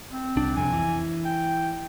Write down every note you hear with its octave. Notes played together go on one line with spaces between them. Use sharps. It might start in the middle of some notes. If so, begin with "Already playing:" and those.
C4
C2 D4
F2 C3 G#5
E3
G5